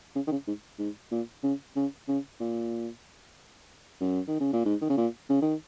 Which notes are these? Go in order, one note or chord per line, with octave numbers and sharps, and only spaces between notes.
C#3
D#3
C#3
G#2
G#2
A#2
C#3
C#3
C#3
A#2
F#2
D#3
C#3
A#2
G#2
D#3
C#3
A#2
C#3
D#3